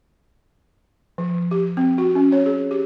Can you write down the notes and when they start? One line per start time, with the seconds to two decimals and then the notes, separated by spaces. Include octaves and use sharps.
1.18 F3
1.51 G4
1.77 C4
1.98 F#4
2.15 C#4
2.32 C#5
2.46 G#4
2.71 G4